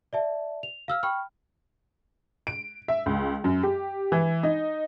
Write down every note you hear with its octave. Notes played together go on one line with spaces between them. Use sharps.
D5 E5 A5
F7
F5 E6 F6
G5 B5 C#6 F6
D7
E5
C#2
F#2
G4
E3
D#4